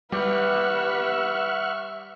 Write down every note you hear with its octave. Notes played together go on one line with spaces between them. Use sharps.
G3 G4 B4 E5 F#5 C#6 F6